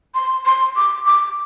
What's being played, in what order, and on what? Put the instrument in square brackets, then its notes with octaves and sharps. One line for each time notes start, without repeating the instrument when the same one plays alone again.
[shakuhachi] C6
C6
D6
D6